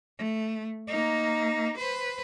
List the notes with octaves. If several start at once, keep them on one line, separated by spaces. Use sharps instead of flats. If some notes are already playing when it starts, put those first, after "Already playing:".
A3
A#3 D#4
B4 C5